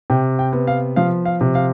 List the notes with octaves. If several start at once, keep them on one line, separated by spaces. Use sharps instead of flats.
C3 G5
G5
B3
F5
F3 F5
F5
C3
F5